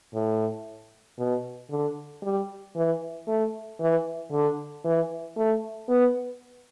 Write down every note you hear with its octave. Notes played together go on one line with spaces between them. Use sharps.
A2
B2
D3
G3
E3
A3
E3
D3
E3
A3
B3